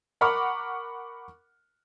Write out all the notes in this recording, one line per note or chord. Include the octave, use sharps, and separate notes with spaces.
A#4 F#5 B5 C#6 D6 F6